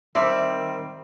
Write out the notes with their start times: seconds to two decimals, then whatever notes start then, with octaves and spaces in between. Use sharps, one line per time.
0.15 D#3 G3 C4 D5 E5